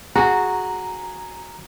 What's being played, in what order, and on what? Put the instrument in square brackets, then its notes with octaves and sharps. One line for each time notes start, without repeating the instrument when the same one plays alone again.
[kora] F#4 [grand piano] G#4 [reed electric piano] A#5